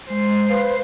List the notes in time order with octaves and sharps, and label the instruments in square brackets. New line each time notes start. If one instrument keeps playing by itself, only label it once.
[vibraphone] G#3 [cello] C5
[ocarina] B4 [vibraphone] F5